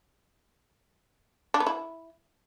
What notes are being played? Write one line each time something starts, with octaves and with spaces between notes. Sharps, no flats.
D4
B3
E4